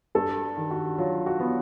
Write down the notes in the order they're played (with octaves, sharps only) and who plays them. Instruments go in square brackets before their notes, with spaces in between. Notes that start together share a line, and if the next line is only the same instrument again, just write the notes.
[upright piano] G2 [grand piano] A4
[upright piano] D#3
[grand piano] F#4
[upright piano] F#3 [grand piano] F4
[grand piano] F#4
[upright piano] B3